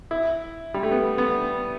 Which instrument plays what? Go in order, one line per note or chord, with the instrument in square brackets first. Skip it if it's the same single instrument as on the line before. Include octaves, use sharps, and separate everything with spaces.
[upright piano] E4
G3
A3
B3
B3